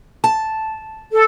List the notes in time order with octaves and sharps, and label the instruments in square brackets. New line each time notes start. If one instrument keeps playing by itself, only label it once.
[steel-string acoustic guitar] A5
[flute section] A4